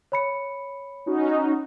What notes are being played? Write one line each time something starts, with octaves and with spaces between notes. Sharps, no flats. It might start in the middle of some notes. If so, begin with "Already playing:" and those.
C#5 B5 C#7
C#4 D#4 F#4